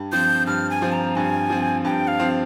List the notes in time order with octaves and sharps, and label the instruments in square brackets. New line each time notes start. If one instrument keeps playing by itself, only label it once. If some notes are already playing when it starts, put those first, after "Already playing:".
Already playing: [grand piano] G2
[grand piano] F3 C4 [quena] G6
[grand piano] G2 [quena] F6
[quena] G#5
[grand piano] F3 C4
[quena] A#5
[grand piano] G2 [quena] G#5
[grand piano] F3 C4
[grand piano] G2 [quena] G5
[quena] F5
[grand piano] F3 C4